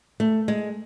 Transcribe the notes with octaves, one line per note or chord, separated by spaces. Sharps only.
A3
G#3